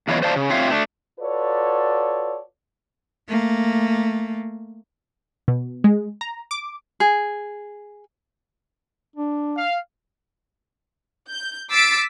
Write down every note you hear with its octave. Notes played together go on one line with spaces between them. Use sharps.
F#2 E3 B3 F4 C#5 D#5
C5 D5 F5 A5
C#3
A3 C4 F4 C#5 E5 F5
A3 D4
F4 F#4 A4 B4 C#5 D5
A3 A#3
B2
G#3
A#5
D6
G#4
D4
F5
G6
D6 E6 A6 B6 C7 D7